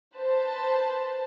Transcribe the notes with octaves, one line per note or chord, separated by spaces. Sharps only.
B4 C5 A5